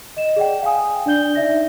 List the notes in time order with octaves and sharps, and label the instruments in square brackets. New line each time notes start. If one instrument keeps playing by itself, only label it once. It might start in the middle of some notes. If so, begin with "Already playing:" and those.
[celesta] D#5 E7
G#4 D5 F#5 G5
F5 G5 G#5 D#6
D4 D5 G6 G7
D#4 D5 E5 A#6